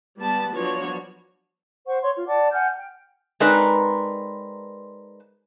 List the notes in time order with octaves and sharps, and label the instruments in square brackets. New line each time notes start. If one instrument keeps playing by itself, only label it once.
[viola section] G3 B3 A5
F3 F#3 B3 D4 F#4 C#5
[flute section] C5 F#5 C#6
C#5 C6 C#6
F4
D5 F#5 A5 D6
F#5 G#5 F6 G6
G5
[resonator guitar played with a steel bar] G#3 C4 D#4 A#4 B4 D5